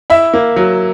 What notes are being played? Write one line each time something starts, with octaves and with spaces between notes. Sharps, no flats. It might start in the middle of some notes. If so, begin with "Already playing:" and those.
E4 E5
A#3
F#3